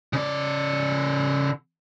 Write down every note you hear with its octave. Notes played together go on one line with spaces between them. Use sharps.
C#3 D5